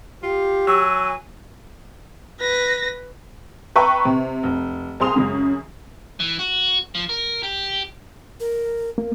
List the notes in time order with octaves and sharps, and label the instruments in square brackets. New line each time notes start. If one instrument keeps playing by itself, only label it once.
[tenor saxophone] F4 [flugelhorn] G4
[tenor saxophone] F#3 [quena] G#5 [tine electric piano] E6
[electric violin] B4 A#6
[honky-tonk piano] B4 E5 G5 A#5 C#6
C3
F1
C2 C4 G#4 C6 D#6 F7
F#2 C#3 G#3
[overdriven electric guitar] E3
F#4
F3
A#4
G4
[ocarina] A#4
[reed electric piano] A#3